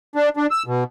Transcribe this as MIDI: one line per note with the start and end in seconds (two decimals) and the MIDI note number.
0.16 0.29 62
0.37 0.47 62
0.51 0.63 88
0.67 0.84 47